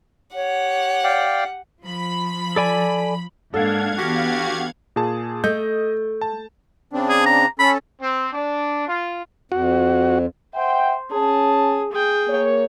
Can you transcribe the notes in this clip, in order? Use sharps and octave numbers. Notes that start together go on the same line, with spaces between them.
G4 C#5 F#5
D5 F5 G5
F3 B5
A4 D5 G#5
G#2 A#3 D4 A4 F5 F#5 G#6
E3 B3 D4 F#4 G4
A#2 G#4 A5
A3 D#5 G6
A5
C#3 C4 D4
G#4
A#5
C#4 A4 B5
C4
D4
F4
F2 F#4
C5 E5 F#5 G5
C#4 G#4 A5
G#4 G5
A#3 C#5